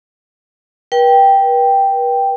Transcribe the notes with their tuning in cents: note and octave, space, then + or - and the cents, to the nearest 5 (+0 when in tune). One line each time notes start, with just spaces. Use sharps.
B4 -45 G5 +0